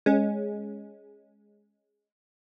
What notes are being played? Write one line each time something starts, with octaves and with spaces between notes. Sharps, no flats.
G#3 C#4